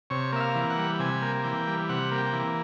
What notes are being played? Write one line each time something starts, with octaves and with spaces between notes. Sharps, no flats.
C3 C#5
A#3 E5
F5
E3
F#5
G3
C3 G#5
A#3
E3 G5
G3
C3 F#5
A#3
G5
E3